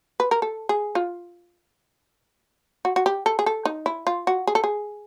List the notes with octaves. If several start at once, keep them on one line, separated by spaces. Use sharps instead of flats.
B4
A#4
A4
G#4
F4
F#4
F#4
G4
A4
G#4
A4
D#4
E4
F4
F#4
G#4
A4
G#4